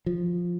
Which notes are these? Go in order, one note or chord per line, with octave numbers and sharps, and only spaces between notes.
F3